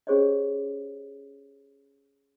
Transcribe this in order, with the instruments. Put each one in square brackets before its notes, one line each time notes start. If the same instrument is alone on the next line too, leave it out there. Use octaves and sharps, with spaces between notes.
[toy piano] C#4 G4 G#4 C5 C#5 D#5